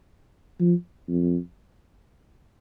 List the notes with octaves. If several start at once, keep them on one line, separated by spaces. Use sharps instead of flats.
F3
F2